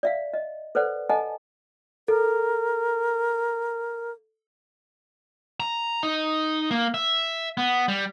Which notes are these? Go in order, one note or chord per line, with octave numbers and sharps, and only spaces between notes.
D5 E5 F5
D#5
A4 B4 C5 D5 F#5
A4 D#5 F#5 G#5 A5
A4 A#4
A#5
D#4
A#3
E5
B3
G3